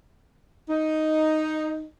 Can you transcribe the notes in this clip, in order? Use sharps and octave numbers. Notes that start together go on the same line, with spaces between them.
D#4